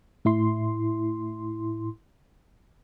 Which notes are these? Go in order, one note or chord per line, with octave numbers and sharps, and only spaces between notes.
A2 E4 C6